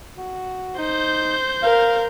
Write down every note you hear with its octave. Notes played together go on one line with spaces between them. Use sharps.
F#4
D#4 C5 G6
A#4 F5